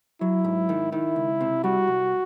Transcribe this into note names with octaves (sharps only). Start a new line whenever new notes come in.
F#3 E4
G#2
D#3
D#3 E4
C#2
C3
G3 F#4
C2